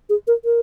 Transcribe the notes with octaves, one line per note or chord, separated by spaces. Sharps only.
G#4
A#4
A#4